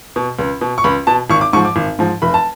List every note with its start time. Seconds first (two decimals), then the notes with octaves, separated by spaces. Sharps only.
0.16 B2
0.39 C#2
0.61 B2
0.78 C#6
0.84 C#2 B5
1.07 B2 A5
1.30 G#1 C#6
1.41 D6
1.53 G#2 F3 C#6
1.65 D6
1.76 G#1
1.99 G#2 F3
2.22 F1 B5
2.34 A5